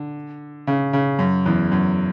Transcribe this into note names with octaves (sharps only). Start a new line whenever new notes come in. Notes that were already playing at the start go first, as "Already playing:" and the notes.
Already playing: D3
C#3
C#3
F#2
E2
F#2